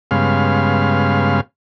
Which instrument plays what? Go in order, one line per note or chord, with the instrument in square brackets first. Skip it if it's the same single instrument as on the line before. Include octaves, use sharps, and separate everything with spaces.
[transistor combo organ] G2 C#3 G#3 B3 F5 C6